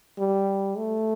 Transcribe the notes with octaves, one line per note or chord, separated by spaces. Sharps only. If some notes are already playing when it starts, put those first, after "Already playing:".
G3
A3